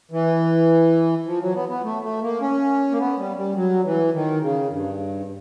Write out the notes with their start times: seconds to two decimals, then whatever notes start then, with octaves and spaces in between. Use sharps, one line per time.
0.11 E3
1.26 F3
1.40 F#3
1.55 B3
1.69 B3
1.83 A3
2.02 A3
2.22 A#3
2.41 C#4
2.91 A#3
2.98 B3
3.18 G3
3.36 G3
3.55 F#3
3.84 E3
4.13 D#3
4.41 C#3
4.70 G2